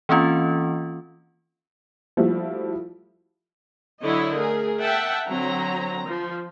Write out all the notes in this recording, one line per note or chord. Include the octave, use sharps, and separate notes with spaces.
E3 A#3 C4 C#4 F4
F3 G3 A3 E4 F#4
D3 F#3 E4 C#5 D#5
A3 G#4 A#4
E5 F#5 G5 A5
D3 F#3 C4 A#5
F3